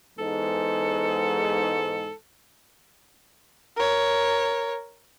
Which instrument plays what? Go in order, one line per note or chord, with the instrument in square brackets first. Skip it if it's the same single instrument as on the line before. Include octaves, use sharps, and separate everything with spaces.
[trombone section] E2 G#2 [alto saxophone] A4
[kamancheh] A#4 C#5